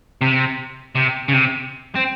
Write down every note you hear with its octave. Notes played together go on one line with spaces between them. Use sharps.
C3
C3
C#3
C3
C4